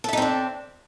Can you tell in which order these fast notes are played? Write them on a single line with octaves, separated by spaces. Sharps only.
A4 E5 D#4 C4 D4